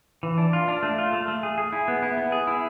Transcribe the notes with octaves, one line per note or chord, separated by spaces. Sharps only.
E3
D4
F4
D4
A3
F4
A3
A3
G#4
G#4
E4
B3
E4
B3
G#4
E4